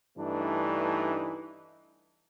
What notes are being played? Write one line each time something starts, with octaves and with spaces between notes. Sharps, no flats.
G2 E3 A3 D4 D#4